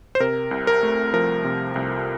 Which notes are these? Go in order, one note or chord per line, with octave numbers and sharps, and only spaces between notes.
C5
C3 A#4
C2
A#4
A3
F3 A#4
C3
C2